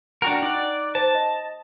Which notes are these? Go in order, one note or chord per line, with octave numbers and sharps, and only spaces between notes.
D4 F#4 A#4 F#5 G5
D#4 D5 F#6
C5 A5
D#5